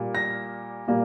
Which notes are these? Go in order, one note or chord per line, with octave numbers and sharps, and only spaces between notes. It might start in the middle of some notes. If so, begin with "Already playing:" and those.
Already playing: A#2 G3 A#3
A#6
A#2 G3 A#3